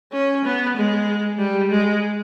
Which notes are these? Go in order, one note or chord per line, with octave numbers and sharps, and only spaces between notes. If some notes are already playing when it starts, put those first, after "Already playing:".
C#4
B3
G#3
G3
G#3